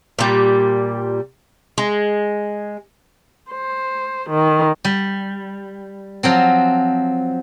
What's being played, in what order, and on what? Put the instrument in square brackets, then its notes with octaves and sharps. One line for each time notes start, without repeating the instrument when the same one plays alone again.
[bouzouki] A#2 G3
G#3
[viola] C5
D#3
[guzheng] G3
F3 F#3 C4